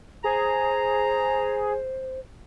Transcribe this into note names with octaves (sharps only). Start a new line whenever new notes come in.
G#4 C5 A#5